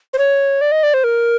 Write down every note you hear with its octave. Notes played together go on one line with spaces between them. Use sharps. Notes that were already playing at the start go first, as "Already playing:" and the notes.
C5
C#5
D5
D#5
D5
C5
A#4